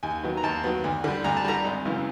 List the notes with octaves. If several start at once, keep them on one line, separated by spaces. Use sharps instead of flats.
D#2 G#5
D#3 F#3 B3
A#5
D#2 A5
D#3 F#3 B3
D2
D3 G3
D2 A#5
A5
D3 G3 A#5
G#1
F#2 C#3 E3 G#3